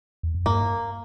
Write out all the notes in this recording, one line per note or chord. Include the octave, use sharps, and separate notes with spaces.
E2
F2
G2 A#3